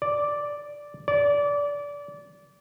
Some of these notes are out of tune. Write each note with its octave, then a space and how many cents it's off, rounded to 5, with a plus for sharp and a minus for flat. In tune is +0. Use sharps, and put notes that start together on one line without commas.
D5 -5
D5 -25